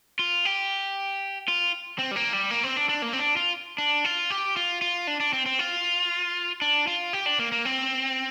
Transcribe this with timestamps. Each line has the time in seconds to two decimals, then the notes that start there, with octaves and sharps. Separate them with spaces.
0.19 F4
0.45 G4
1.48 F4
1.99 C4
2.11 G3
2.16 A#3
2.33 G3
2.51 A#3
2.64 C4
2.76 D4
2.89 D4
3.02 A#3
3.13 C4
3.19 D4
3.36 F4
3.78 D4
4.05 F4
4.30 G4
4.57 F4
4.82 F4
5.07 D4
5.20 D4
5.33 C4
5.46 C4
5.59 F4
6.62 D4
6.87 F4
7.13 G4
7.26 D4
7.39 A#3
7.52 A#3
7.65 C4